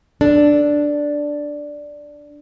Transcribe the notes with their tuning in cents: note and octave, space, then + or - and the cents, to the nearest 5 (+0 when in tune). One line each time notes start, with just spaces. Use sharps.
D4 +0 A4 +0